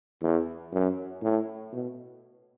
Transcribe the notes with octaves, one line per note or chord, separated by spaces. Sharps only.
E2
F#2
A2
B2